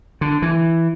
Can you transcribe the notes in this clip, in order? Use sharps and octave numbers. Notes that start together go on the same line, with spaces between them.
D3
E3